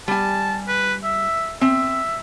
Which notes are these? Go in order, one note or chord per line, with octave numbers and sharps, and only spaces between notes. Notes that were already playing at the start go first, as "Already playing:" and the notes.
G3 G#5 A5
B4
E5
C4 E5